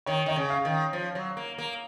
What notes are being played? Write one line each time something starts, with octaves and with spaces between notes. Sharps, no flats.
D#3 C#5
D#3 D#5
C#3
F5
D#3
F3
F#3
A#3
A#3